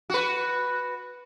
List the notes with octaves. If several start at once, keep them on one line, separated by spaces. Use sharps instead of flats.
F#4 B4